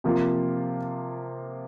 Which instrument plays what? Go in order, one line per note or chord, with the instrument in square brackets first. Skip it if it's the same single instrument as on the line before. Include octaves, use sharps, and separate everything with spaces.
[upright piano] C3 F3 A#3 F4